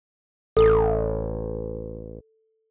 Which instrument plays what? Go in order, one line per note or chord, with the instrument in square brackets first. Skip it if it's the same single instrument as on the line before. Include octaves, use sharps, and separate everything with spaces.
[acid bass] A1 [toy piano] A4